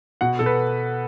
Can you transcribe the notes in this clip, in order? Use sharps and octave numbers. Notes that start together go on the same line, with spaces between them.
B2 F#5
B2 A4
B4